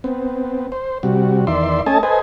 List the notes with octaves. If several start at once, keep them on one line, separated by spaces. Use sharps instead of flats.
B3 C4
C5
C3 G3 F#4
E2 D#3 D5 E5 C6
A3 C#4 A4 D#5 G#5 A5
A4 B4 C5 D#5 G#5